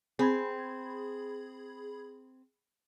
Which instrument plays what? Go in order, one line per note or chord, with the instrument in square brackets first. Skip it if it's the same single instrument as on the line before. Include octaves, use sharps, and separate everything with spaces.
[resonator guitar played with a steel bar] C4 [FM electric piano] G#4 B5 G#6